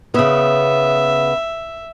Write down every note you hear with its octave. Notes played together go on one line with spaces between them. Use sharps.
C#3 B3 E5